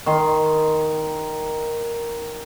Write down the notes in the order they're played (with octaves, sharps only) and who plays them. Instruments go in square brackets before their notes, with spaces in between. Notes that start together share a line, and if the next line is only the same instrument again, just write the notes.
[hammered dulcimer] D#3 C6